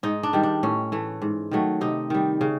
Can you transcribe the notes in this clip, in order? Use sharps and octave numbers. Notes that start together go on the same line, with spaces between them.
G#2 D#4
D4
D#3 G3
D4
A2 C#4
E3 A3
G#2
D#3 F#3 A3
C3 D#4
D#3 G3
C#3